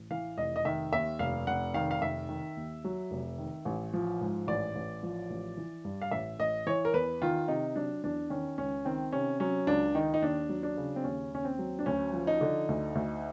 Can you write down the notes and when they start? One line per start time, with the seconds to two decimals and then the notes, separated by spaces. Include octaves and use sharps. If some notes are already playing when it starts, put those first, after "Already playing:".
Already playing: A1
0.10 E3 F5
0.37 F1 D#5
0.56 D#5
0.65 D#3 E5
0.93 D#2 E5
1.19 F1 F5
1.47 F1 F#5
1.74 D#3 F5
1.91 F5
2.02 F1 E5
2.29 D#3
2.57 D#2
2.85 F#3
3.11 F1
3.38 D#3
3.65 A1
3.93 F3
4.21 G#2
4.47 A1 D5
4.75 A1
5.03 F3
5.30 A1
5.57 E3
5.85 G2
6.02 F5
6.11 A1 E5
6.39 A1 D#5
6.66 E3 C#5
6.85 A#4
6.94 E2 B4
7.22 D#3 F4
7.48 C3 D#4
7.76 F#3 D4
8.04 E2 D4
8.30 D#3 C#4
8.58 C#2 C#4
8.85 D#3 C4
9.12 C3 C#4
9.40 F#3 C#4
9.67 C#2 D4
9.95 D#3 D#4
10.14 D#4
10.22 D#2 D4
10.49 F#3
10.63 D4
10.77 C#3
10.96 C4
11.04 D#2 C#4
11.32 D#2 C#4
11.45 C4
11.59 F#3
11.79 D4
11.86 D2 C#4
12.13 F3
12.27 D#4
12.41 D3
12.68 D2
12.95 D2